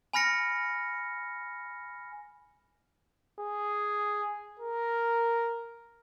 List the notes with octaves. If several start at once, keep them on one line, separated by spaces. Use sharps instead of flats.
G#5 B5 F6 A#6 C#7
G#4
A#4